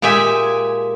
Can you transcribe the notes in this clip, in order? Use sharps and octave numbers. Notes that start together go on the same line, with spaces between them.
A#2 G#3 G4 E5 G#5